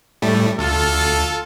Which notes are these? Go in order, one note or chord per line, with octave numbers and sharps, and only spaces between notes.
A2 G3 A3
D2 F4 A4